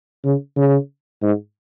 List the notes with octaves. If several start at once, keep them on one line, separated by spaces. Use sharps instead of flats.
C#3
C#3
G#2